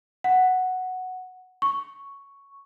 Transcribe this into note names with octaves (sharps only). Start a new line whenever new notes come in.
F#5
C#6